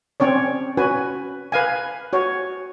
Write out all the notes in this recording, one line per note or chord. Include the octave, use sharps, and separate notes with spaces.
C4 C#4 C#5 D5
C#4 F#4 B4 G#5
B4 F5 G#5
F#4 C#5